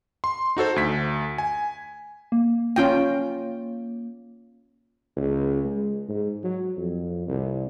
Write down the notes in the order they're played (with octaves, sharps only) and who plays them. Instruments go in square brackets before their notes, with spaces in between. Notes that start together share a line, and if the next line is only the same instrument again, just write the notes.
[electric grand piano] C6
D#4 F#4 A4 C5
D2 B6
G#5
[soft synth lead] A#3
[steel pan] C#4 F4 G5
[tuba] C#2
G#3
G#2
F#3
F2
C2